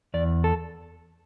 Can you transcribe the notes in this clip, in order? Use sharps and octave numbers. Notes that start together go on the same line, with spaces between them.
E2 D5
A4